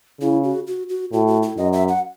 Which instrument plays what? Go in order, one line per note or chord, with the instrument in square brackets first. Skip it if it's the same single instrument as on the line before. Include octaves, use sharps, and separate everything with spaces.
[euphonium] C#3 [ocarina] E4
[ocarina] F#4
F#4
F#4
[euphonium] A2 [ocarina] F#4
[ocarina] F#4
E4
[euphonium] F#2 [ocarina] D#5
[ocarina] E5
F#5